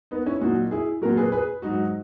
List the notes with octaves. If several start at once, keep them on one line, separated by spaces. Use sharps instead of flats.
B3 D#4
C#4 E4
A#2 F#3 D#4 F#4
E4 G#4
A#2 F#3 F#4 A#4
G#4 B4
G#4 B4
G#2 F#3 D#4 F#4